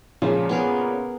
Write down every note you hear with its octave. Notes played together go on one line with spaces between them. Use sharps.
A#2 C#3 F3 G#3
B3 G#4 A#4